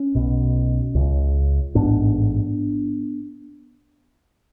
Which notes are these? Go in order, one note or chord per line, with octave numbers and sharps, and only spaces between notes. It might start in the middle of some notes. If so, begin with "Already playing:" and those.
Already playing: C#4
B1 B2
C#2 C#3
A1 G#2 B3 D4